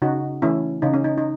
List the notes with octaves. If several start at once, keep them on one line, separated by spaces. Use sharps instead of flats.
C#3 D#4 F#4
E3 A3 C#4 E4
C#3 D#4
C#4
D#4
D#4